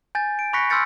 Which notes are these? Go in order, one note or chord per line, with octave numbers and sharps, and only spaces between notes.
G#5 G6 A6
D7
B5 C#6 F#6 A#6 B6 C#7
C6 E6 F6 G6 A6 C#7